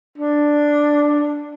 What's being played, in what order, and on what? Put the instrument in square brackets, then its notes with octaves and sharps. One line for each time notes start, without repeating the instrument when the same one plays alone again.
[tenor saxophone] D4